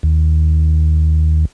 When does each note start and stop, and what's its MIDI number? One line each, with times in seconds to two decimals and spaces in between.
0.03 1.45 39